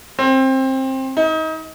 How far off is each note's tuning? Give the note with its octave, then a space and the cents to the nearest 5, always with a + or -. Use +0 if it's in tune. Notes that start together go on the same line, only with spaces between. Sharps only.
C4 +20
D#4 +30